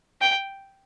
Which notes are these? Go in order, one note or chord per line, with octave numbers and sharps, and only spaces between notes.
G5